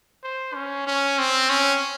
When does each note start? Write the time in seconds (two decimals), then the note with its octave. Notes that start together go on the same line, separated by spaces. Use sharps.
0.23 C5
0.55 C#4
0.87 C#4
1.19 C4
1.50 C#4